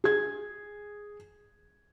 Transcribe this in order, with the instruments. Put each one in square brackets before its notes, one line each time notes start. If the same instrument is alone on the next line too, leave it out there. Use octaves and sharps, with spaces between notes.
[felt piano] G#4 G#6